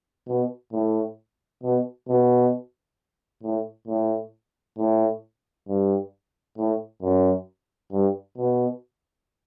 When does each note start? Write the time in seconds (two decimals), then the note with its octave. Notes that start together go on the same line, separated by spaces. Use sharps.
0.28 B2
0.73 A2
1.63 B2
2.08 B2
3.43 A2
3.88 A2
4.78 A2
5.68 G2
6.58 A2
7.02 F#2
7.92 G2
8.37 B2